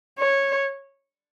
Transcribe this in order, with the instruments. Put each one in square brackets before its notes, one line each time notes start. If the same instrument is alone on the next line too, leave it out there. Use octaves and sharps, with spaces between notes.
[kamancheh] C#5